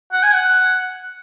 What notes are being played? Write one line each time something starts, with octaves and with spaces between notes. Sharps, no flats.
F#5
G#5
F#5